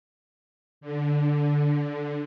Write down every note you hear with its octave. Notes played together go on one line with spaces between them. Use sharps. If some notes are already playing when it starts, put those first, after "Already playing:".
D3